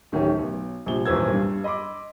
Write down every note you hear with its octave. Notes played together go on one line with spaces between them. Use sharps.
D1 D#3 A3 C#4 G4
B1
A#1 C3 G3 G7
D#1 G#1 E3 C5 E6 G#6
G2
D#5 B5 C6 D6